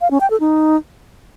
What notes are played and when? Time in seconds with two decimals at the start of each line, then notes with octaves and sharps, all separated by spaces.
0.01 F5
0.11 C#4
0.21 G5
0.30 A4
0.40 D#4